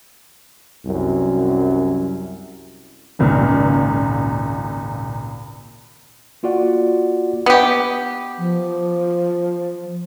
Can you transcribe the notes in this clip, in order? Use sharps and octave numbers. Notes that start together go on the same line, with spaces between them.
C2 F#2
G#1 C#2 A#2 F6
A#3 F4 F#4 D5 F#5
B3 G4
F3